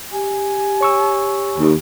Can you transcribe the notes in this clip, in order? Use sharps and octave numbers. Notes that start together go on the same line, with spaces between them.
G4 G#5
C#5 C#6 E6
D#2